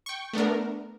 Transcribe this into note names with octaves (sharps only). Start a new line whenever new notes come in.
G5 C#6
A3 B3 D4 A#4